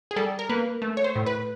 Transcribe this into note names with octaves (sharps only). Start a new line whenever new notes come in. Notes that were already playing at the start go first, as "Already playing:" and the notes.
G#4
G3 A4
A#4
A#3 B4
A3
C#5
C5
A2
B4